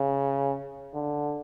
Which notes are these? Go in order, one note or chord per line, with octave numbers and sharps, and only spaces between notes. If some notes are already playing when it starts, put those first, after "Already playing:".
Already playing: C#3
D3